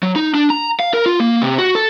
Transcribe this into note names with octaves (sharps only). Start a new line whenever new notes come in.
F#3
D#4
D4
A#5
F5
A#4
F4
A#3
C3
F#4
A4